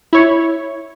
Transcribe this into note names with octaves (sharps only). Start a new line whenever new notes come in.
E4 C#5